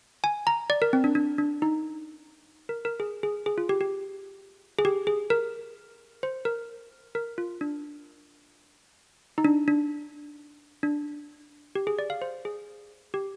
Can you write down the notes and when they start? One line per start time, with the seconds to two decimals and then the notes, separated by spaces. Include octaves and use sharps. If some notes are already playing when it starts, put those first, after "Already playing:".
0.24 G#5
0.47 A#5
0.70 D5
0.82 A#4
0.93 C4
1.04 D4
1.15 D4
1.38 D4
1.62 D#4
2.69 A#4
2.85 A#4
3.00 G#4
3.23 G#4
3.46 G#4
3.58 F4
3.69 G4
3.81 G4
4.79 G#4
4.85 G4
5.07 G#4
5.30 A#4
6.23 C5
6.45 A#4
7.15 A#4
7.38 F4
7.61 D4
9.38 D#4
9.45 D4
9.68 D4
10.83 D4
11.75 G4
11.87 G#4
11.99 D5
12.10 F5
12.22 C5
12.45 G#4
13.14 G4